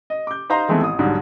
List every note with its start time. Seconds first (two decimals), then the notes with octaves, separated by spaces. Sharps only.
0.10 D#5
0.27 D6 G6
0.50 D#4 C5 F5 A#5 C6
0.68 D#3 E3 G#3 A3 B3 C4
0.81 A1 D#6
0.99 B1 G#2 D3 G3